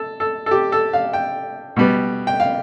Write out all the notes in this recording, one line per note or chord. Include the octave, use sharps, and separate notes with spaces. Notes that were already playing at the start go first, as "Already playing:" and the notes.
Already playing: A4
A4
A4
G4
A4
F5
G5
B2 G3 B3
G5
F5